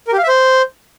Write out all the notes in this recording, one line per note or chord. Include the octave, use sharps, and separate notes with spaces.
A#4
G4
F5
E5
C5